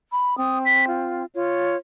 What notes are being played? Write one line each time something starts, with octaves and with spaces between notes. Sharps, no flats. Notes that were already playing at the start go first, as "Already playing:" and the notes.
B5
C4 D#6
B6
F4
F4 C#5